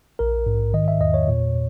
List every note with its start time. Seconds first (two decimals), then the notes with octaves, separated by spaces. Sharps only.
0.19 A#1 A#4
0.46 G#2
0.74 D#3 D#5
0.88 E5
1.00 E2 D#5
1.14 C#5
1.28 A#2